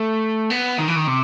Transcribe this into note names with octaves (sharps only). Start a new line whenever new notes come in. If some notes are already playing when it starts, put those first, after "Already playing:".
Already playing: A3
B3
D#3
E3
D#3
C3